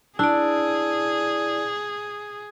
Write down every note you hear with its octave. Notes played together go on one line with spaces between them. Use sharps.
D4 E4 G#4 D5